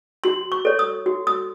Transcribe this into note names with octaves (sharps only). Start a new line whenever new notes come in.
F#4 C6
C#6
A4 C#5
D#6
F#4
D#6